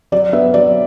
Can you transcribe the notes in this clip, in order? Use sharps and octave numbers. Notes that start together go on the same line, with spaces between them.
F#3 D5
B3 E5
F#3 D5